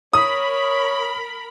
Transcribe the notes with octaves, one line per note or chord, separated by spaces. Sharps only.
A#4 C#5 B5 D#6